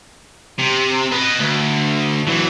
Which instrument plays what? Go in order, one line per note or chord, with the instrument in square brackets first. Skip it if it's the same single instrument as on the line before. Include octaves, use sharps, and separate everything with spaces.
[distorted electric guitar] C3
B4 D#5
D2
E3 F#3